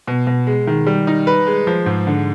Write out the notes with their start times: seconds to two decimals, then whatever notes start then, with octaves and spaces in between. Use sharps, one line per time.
0.08 B2
0.27 B2
0.47 G#3
0.67 D#3
0.87 G3
1.07 D#4
1.27 B4
1.47 G#3
1.67 F3
1.86 G#2
2.07 D3